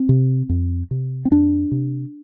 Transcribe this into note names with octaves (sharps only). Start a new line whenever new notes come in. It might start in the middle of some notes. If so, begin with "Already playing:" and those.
Already playing: C4
C3
F2
C3
C4
F2 D4
C3